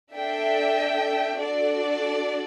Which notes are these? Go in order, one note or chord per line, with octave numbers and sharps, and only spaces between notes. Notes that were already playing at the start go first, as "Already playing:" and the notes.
D4 A4 E5 G5
D4 F#4 A4 D5